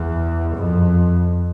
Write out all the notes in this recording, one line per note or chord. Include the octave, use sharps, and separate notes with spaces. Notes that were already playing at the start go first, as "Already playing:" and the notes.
Already playing: E2
F2